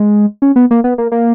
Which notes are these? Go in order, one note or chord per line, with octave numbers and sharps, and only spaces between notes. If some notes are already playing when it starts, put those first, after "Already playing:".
Already playing: G#3
C#4
B3
A#3
B3
A#3
A#3